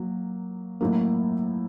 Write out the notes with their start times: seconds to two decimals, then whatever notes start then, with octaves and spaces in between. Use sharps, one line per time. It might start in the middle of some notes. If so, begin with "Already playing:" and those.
Already playing: F#3 A#3
0.81 A2 F#3 A#3